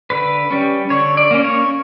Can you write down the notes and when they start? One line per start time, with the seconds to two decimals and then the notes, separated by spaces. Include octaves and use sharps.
0.10 D3 B4
0.51 G3 C#4
0.90 D3 C#5
1.17 D5
1.31 A#3 C#4
1.44 C#5